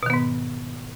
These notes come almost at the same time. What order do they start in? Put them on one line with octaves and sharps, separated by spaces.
B2 D#3 B3 G#2